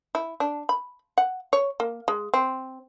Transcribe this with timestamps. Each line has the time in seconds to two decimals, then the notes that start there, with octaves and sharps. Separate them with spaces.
0.15 E4
0.40 D4
0.69 B5
1.18 F#5
1.53 C#5
1.80 A#3
2.08 G#3
2.34 C4